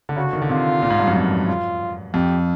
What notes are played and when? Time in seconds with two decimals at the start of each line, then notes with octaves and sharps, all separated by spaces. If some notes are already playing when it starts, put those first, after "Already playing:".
0.09 D3
0.16 C#3 F#4
0.24 D3
0.33 D#3
0.42 D3
0.49 C3 F4
0.82 A#2
0.90 G#2
0.99 G2
1.07 F#2
1.16 F2
1.48 F4
2.14 F2 G4